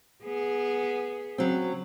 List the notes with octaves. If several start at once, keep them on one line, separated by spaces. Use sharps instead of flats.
B3 G#4
C#3 F#3 C4